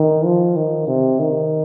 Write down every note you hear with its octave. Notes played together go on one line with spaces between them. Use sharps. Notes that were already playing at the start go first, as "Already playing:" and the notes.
Already playing: D#3
F3
D#3
C3
D#3